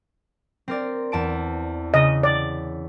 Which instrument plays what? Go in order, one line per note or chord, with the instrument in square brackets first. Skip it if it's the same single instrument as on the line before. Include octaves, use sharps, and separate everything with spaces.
[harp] C4 A#4 D5
E2 A5 D7
[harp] C#3 [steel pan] D#5
[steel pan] D5